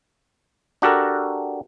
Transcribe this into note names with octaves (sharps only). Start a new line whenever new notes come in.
D4 F#4 G4 A4 A#4